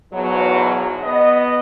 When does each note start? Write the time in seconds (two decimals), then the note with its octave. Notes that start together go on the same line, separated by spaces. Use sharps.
0.12 E2 G#2 B2 F#3
1.04 B3 D#5